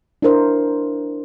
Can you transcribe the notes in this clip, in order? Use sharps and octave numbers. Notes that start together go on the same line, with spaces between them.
D4 E4 A#4 C5